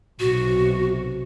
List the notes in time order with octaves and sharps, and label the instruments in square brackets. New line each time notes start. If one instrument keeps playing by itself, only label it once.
[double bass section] B1 C3 [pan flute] F#4